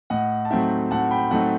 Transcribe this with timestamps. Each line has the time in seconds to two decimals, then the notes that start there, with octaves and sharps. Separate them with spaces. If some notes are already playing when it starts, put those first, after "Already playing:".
0.10 A2 D#5 F#5
0.45 A5
0.50 F#3 A3 C4 D#4 E5 G5
0.91 A2 F#5 A5
1.11 G5 B5
1.31 F#3 A3 C4 D#4 F#5 A5